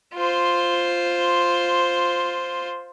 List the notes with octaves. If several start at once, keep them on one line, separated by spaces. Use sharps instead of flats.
F4 C5